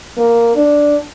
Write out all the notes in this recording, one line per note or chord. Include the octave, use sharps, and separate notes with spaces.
A#3
D4